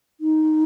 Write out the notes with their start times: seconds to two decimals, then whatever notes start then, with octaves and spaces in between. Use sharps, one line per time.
0.21 D#4